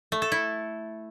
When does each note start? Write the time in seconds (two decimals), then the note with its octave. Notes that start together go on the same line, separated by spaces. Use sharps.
0.12 A3
0.22 A4
0.32 E4